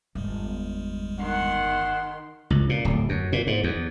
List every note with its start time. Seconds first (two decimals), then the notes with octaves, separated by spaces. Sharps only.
0.15 G1 E2 G3 G#3
1.19 D#3 F#5 C6
2.50 C#2
2.69 A#2
2.85 D1
3.09 F#2
3.32 A#2
3.47 G#2
3.64 E2